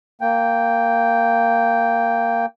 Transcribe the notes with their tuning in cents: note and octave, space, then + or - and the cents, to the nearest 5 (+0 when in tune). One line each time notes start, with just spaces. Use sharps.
A#3 -10 G5 +0